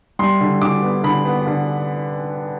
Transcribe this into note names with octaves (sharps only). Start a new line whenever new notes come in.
G3 C6
D3
D3 D6
B3
D3 B5
B3
D3